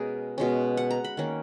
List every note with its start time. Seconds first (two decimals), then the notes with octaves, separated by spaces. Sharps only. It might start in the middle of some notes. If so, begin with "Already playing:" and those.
Already playing: B2 G#3 C#4 G#4 A#4
0.38 B2 G#3 C#4
0.77 F#5
0.90 A#5
1.04 B5
1.17 D#3 A#3 C#4